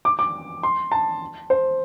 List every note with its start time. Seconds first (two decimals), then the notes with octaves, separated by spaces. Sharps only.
0.05 D6
0.19 D6
0.63 C6
0.92 A5
1.50 C5